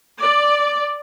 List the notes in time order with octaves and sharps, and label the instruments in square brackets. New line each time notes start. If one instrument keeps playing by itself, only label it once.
[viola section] D5